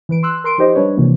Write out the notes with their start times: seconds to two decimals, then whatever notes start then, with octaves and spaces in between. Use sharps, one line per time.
0.09 E3 B4 D7
0.23 C6 E6 F#6
0.44 A#4 C6 D7
0.58 F3 D#4 G4 C5 D#5
0.75 G3 D4 B4 C#5
0.97 C3 E3 F3 A#3